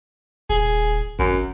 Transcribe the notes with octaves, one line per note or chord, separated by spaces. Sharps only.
D#1 G#4
G#1 F#2